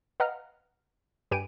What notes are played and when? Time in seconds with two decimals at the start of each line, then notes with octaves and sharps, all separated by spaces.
0.20 B4 D#5 F5 F#5 A#5 F6
1.31 G2 G4 B4 G#5 D7 D#7